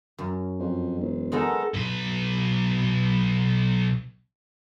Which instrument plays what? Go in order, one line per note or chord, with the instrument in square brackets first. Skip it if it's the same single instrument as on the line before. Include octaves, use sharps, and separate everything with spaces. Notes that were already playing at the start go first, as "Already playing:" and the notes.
[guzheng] F#2
[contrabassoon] F2
E1
[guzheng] G#3 B3 D#4 [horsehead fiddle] A4 A#4
[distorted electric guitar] B1 B4